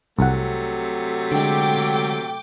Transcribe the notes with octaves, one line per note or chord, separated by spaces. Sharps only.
C2 C3 F#3 A3 F#5
D3 G#3 G5 D6